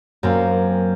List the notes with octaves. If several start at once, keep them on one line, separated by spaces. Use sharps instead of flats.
F#2 A#3 C4 C#4